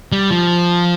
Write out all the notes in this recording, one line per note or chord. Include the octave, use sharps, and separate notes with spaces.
G3
F3